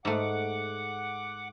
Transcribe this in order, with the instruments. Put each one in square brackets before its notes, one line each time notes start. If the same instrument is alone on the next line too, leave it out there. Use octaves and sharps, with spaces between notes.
[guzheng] G#2 A3 [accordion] F#5 D6